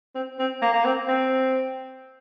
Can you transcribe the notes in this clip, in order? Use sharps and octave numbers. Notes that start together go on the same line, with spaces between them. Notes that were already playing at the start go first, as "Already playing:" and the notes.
C4
C4
A#3
A#3
C4
C4